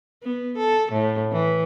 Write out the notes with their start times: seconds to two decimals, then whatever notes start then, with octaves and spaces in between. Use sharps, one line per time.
0.23 B3
0.58 A4
0.92 A2
1.32 E3